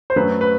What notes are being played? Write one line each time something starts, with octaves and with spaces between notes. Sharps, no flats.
C5
F#2 F#3 A3 B4
B4